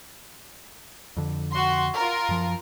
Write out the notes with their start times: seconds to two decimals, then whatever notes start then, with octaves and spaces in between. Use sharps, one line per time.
1.17 F2 D3
1.50 F#4 C6
1.94 F4 A#4
2.29 F#2 F3